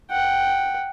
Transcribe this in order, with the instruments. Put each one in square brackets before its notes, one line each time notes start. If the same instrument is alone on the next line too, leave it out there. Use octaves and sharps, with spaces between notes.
[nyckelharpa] F#5 G5